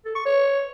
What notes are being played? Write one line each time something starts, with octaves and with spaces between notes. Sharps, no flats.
A4
C#6
C#5